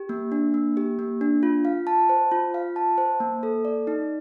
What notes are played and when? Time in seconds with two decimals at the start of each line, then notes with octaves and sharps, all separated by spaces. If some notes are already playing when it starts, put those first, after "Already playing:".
Already playing: G4
0.09 A#3
0.32 D4
0.54 A#3
0.77 G4
0.99 A#3
1.21 D4
1.43 F4
1.65 F5
1.87 A5
2.09 C5
2.31 F4
2.54 F5
2.76 A5
2.98 C5
3.20 A#3
3.43 A4
3.65 D5
3.87 D#4